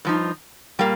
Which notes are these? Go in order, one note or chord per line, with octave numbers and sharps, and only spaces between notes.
G2 F3 D#4
A#2 G3 A#3